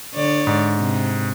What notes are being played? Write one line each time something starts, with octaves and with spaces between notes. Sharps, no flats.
D3 C#5 D5
G#2
C3